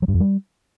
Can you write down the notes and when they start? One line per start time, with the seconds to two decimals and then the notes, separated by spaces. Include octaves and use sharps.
0.02 F#3
0.08 G2
0.14 F2
0.20 G3